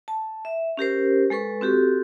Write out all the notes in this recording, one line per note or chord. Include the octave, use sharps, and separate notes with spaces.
A5
E5
C#4 G4 A#4 C5
G#3 A4 B4 C#6
C4 F#4 G4 A4